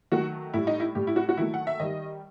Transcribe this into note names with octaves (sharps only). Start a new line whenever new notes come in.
D#3 F#3 A3 F#4
A2 G3 E4
D#4
E4
A2 G3 G4
E4
F#4
F#4
D#3 F#3 A3 E4
F#5
E5
D#3 G3 D#5